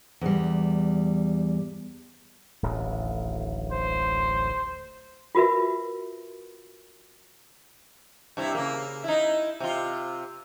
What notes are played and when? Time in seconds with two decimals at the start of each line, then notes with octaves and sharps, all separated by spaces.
0.21 E2 G3
2.63 D1 A1 D#2
3.72 C5
5.35 F4 F#4 A#4 B4 E5
8.37 G2 C3 E4
8.55 C#3 A#3
9.04 D#4 E4
9.60 C3 F4